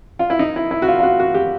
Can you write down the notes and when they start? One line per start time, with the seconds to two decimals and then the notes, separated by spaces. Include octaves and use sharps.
0.19 F4
0.30 E4
0.39 D#4
0.56 E4
0.71 E4
0.82 F#4
0.88 F4
0.99 F4
1.03 F#4
1.19 F#4
1.34 G4